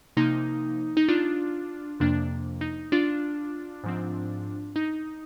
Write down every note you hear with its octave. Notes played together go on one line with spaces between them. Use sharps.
C3 F3 A#3 D#4
D#4
D4 F4
F2 C3 F3 A#3 D4
D#4
D4 F4
G#2 F3 C4
D#4